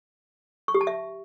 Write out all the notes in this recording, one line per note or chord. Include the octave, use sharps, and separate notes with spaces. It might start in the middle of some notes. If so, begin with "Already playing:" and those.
C#6
G4
A5
E5